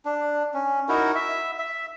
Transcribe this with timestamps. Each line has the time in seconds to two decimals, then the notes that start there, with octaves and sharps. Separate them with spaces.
0.05 D4
0.54 C#4
0.89 D#4 E4 F#4 A#4
1.15 E5
1.59 E5